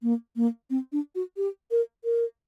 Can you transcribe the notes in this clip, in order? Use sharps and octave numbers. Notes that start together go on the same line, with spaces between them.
A#3
A#3
C4
D4
F#4
G4
A#4
A#4